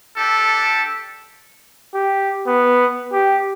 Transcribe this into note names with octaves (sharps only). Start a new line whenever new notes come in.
D4 G4 A4
G4
B3
G4